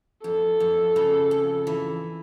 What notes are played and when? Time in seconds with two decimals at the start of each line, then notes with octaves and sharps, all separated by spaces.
0.24 F2 A4
0.60 F2
0.96 C#3
1.31 F2
1.67 E3